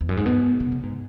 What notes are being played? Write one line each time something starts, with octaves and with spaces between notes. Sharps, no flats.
E2
F#2
G#2
B2
C#3
C#3
G#2